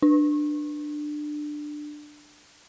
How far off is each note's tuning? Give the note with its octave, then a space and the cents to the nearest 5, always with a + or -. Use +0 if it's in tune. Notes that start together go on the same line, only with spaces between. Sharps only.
D4 +20